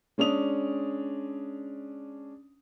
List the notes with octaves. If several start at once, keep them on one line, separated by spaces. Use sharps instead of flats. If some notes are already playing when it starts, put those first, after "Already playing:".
G#3 C#4 D4 D#6 F7